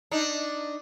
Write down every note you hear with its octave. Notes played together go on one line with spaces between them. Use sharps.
D4 D#4